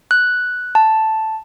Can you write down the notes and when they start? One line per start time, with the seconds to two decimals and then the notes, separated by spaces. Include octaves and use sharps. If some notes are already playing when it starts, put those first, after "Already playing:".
0.11 F#6
0.75 A5